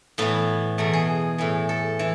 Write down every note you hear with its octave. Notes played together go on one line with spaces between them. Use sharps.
A2 E3 B3
E2 B2 A3
G#4
A2 E3
A4
E3